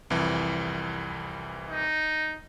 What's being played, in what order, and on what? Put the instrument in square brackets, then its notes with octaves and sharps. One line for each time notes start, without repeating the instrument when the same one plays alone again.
[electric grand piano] C2 F2 E3
[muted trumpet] D#4